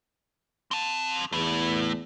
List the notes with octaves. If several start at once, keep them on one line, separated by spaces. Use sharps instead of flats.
C4 A5
E2 A3 E4